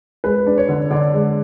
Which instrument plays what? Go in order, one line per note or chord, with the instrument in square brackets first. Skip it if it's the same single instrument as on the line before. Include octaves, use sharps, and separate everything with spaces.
[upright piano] G#3 [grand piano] B4
[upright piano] D4
[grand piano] C#5
[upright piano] D3
[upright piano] D3 [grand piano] D5
[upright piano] G#3